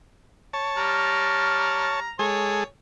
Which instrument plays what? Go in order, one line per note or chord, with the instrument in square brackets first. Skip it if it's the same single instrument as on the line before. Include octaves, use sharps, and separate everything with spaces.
[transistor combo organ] C#5 A5
[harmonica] G3 A#5 F6
[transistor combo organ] G#3 G#4 A4 [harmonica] C#5